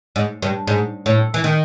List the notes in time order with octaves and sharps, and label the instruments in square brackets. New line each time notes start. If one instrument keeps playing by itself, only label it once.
[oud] G#2
G2
G#2
A2
E3
D#3